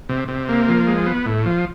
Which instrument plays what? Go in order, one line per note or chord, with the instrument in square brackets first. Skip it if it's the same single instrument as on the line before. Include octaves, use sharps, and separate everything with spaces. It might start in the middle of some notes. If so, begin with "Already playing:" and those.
[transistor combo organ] C3
C3
A#3
F3
G#3
B3
A2
F3